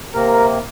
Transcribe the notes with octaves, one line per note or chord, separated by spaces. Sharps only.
C3 A#3 A#4